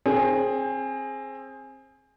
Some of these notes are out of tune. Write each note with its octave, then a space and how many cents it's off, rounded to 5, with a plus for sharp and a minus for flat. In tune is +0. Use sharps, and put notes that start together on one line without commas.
C4 +25 G#4 +5